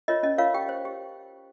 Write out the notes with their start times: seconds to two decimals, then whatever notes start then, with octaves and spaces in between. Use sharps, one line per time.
0.08 F4 A#4 C#5 D#5
0.23 C#4 D#5
0.38 F4 A#4 C#5 F5
0.54 G4 G5
0.69 C5
0.85 G4